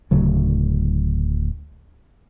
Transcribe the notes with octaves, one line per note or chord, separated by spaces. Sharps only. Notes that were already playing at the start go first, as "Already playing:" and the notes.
D1 D2 C#3 F#3